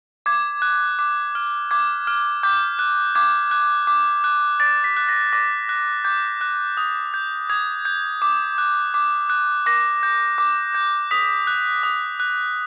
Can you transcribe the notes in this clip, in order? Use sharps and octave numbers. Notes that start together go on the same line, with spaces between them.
D6 G#6
F#6
D6
F6
D6 G#6
F6
D6 G6
F#6
D6 G#6
F#6
D6
F#6
D6 A6
B6
F#6
A#6
D6 A#6
F#6
D6 G6
F#6
D#6
G6
D#6 G#6
G6
D6
F#6
D6
F#6
D6 A#6
G6
D6
G6
D#6 B6
F#6
D#6
F#6